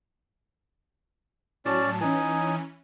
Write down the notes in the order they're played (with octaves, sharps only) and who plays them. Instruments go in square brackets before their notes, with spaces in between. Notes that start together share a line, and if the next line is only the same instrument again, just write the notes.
[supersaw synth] A2 F#3 A5 [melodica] C#4 D5
[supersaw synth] E3 C#4 [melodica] D#4 G#5